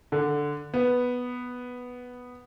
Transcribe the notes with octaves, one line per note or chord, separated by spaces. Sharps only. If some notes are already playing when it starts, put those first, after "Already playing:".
D3
B3